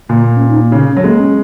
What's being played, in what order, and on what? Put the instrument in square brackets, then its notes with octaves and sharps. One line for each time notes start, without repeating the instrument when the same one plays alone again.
[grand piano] A#2 [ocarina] A#3
[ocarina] A#3
C#4
D#4
A#3
[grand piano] C#3
[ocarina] C#4
[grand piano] F#3
[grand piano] G#3 [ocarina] A#3
[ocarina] C#4